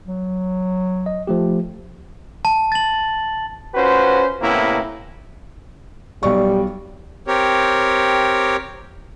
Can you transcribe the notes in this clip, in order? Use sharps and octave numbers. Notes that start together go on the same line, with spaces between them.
F#3
D#5
F3 A3 G4
A5
A6 F#7
C#4 F4 F#4 B4 C5
A2 C3 A#3 B3 C#4 E4
B1 G3 D5 C#6
C4 G4 A#4 C#5